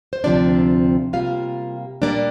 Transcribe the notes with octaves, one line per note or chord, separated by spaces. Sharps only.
C5
D2 C3 F3 C4 D4 D5
C3 G3 A#3 F4 F5
A#2 G3 A#3 D4 D5